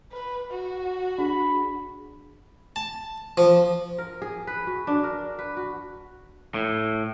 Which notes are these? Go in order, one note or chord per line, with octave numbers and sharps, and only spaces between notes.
B4
F#4
D4 G#4 B5
A5
F3
A#4
G#4
B4
F#4
D4
A#4
B4
F#4
A2